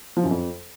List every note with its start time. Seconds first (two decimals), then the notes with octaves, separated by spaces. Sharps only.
0.17 F3
0.24 F#2
0.31 F2